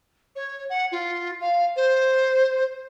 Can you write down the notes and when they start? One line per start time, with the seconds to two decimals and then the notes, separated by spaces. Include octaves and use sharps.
0.36 C#5
0.70 F#5
0.92 F4
1.41 F5
1.76 C5